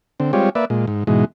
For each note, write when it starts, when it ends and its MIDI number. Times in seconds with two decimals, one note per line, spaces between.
0.20 0.32 50
0.20 0.32 60
0.33 0.49 55
0.33 0.49 56
0.33 0.49 60
0.33 0.49 65
0.33 0.49 67
0.33 0.49 73
0.55 0.65 58
0.55 0.65 71
0.55 0.65 74
0.55 0.65 76
0.70 0.86 46
0.70 0.86 56
0.87 1.04 44
1.07 1.25 44
1.07 1.25 47
1.07 1.25 52
1.07 1.25 56